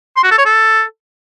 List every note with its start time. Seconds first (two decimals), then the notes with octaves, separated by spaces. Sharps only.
0.17 C6
0.24 F#4
0.31 A4
0.38 C#5
0.46 A4